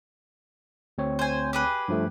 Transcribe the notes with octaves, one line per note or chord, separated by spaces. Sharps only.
D2 C4 C#5
C5 G#5
G4 G#4 B4
G2 F3 A3